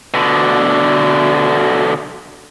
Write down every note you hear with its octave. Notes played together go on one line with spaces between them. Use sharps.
B2 D3